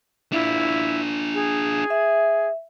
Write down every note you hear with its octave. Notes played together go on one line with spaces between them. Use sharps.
D4 E4 F4
G#4
E5